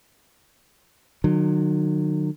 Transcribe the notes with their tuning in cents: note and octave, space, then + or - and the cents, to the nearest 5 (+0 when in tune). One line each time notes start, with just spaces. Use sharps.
D#3 -45 F#3 -15